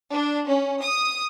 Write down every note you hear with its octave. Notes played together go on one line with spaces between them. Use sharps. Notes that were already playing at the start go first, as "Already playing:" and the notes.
D4
C#4
D#6